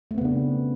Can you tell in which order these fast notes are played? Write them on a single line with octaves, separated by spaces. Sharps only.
A3 C4 B3 C#3 D4